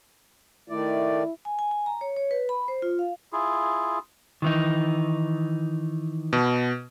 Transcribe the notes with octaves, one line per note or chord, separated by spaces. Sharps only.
D#3 A3 E4 D5
G#5
G#5
G#5
A#5
C#5
C#5
B4
B5
C5
F4
F5
E4 F4 G#4
D#3 E3 D#4
B2